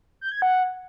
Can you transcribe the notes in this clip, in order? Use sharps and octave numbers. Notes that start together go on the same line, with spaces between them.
G6
G#6
F#5